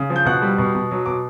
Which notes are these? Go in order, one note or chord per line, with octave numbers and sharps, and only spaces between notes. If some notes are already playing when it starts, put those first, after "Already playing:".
Already playing: C#3
F3
G6
B2 F#5 F#6
G3
B2
B2
F#3
B2 D6